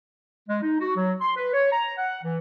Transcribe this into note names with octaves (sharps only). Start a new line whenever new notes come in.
G#3
D#4
F#4
F#3
C6
B4
C#5
A#5
F#5
E3